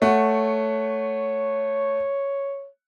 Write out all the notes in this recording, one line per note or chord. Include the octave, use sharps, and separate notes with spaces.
A3 C#5 F#5